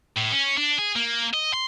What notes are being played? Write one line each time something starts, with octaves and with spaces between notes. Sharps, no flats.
A2
C#4
D4
G#4
A#3
D#5
C6